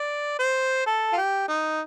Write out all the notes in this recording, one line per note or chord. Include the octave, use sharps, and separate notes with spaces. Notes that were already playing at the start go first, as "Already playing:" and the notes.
Already playing: D5
C5
A4
F4
G4
D#4